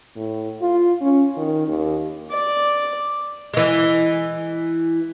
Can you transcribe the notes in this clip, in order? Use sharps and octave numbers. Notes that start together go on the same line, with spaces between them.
A2
F4
C#4
D#3
D#2
D5
E3 G#3